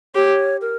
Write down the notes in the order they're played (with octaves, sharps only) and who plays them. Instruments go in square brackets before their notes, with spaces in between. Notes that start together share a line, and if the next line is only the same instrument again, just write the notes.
[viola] G4 [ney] C#5
[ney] A#4